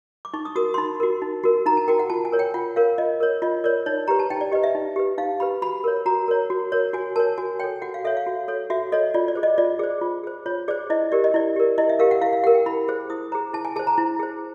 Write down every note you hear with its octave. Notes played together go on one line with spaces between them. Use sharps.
D6
D#4 C#6
D#6
F#4 A#4 D#6
C6
D#4 B5
F#4 A#4
D#4
F#4 A#4
D#4 A#5
A5
F#4 A#4 G5
F#5
F4 A5
G#5
A#4 C#5
G5
F4 F#5
A#4 C#5 F5
F4 D#5
A#4 C#5
F4 D#5
A#4 C#5 D5
D#4 C#5
G4 B4 A#5
A5
D#4 G5
D5
G4 B4 D#5
E5
D#4
G4 B4
D#4 F5
G4 B4 B5
F#4 B5
A#4 C#5
F#4 A#5
A#4 C#5
F#4
A#4 C#5
F#4 G#5
A#4 C#5 A5
F#4 G#5
A4 C#5 G5
F#4 F#5
F5
A4 C#5 E5
F5
F#4
A4 C#5
F#4 E5
A4 C#5 D#5
F4 D5
D5
G#4 C5
D#5
F4 D5
G#4 C5
F4
G#4 C5
F4 C#5
G#4 C5 D5
E4 D#5
G4 A#4 D5
D#5
E4 D5
G4 A#4
E4 D#5
E5
G4 A#4 F5
F#5
E4 F5
F5
G4 A#4 F#5
G5
E4 B5
G#4 C5
E4 D#6
G#4 C5 A#5
E4 A5
G#5
G#4 C5 A5
A#5
E4
G#4 C5